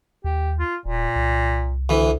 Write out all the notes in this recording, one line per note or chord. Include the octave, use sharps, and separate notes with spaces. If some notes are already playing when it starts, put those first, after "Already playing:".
D#2 G4
F4
D#1 A#2
C2
D2 E3